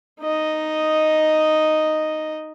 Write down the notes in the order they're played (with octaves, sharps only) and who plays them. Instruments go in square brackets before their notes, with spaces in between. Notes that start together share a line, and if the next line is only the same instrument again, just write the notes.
[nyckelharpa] D#4 D#5